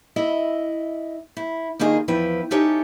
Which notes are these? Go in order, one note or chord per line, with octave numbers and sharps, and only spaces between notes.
E4 D#5 E5
E4
G2 D#3 A#3 F4 G#4 D#5
E2 F3 E4 B4 G5
C#4 D#4 G4 A4 C#5 E5